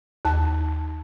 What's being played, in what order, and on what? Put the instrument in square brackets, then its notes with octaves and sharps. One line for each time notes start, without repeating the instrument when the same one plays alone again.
[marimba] D#2 A5